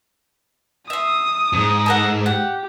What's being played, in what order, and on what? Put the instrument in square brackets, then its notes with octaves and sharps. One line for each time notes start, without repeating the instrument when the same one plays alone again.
[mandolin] E5 C6 [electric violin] D#6
[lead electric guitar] F2 G#2
[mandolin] A4 A#4 F#5
[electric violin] G4 [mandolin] F#5